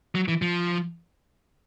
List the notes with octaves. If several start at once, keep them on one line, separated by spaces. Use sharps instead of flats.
F#3
E3
F3